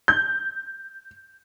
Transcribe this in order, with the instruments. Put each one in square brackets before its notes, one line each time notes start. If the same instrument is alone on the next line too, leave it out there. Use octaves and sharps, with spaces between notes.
[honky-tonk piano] G6